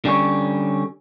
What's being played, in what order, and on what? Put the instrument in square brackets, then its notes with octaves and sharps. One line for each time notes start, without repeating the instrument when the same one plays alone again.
[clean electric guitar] D3 G3 C#4 C#5